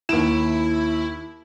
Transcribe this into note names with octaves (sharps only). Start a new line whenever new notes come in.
D#2 E4 D7 E7